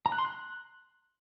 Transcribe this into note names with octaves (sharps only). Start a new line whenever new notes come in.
A#5
F#6
C6
F#6